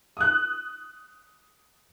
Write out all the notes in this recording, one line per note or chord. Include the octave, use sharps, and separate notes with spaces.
D#6 F#6